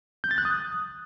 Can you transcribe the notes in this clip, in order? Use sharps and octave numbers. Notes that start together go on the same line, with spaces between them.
G6
A6
F#6
D#6